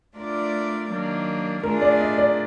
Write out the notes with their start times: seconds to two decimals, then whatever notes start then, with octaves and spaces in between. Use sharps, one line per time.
0.16 A3 D4 F4 A#4 D5
0.90 D#3 F#3 A#3 D4
1.63 A3 D4 F4 G#4 A#4
1.82 D5
2.00 D#5
2.18 D5